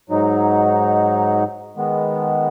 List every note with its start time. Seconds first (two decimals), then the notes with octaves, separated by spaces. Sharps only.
0.10 G#2 F#3 D#4
1.77 D#3 G#3 B3